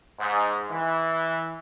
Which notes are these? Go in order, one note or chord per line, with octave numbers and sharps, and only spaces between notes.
G#2
E3